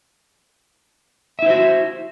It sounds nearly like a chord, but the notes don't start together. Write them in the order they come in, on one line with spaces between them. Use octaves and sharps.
E5 E4 C5 F#4